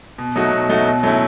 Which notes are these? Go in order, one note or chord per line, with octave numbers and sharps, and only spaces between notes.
B2
F#3 A3 D#4 F#4
B2
F#3 A3 D#4 F#4
B2
F#3 A3 C#4 E4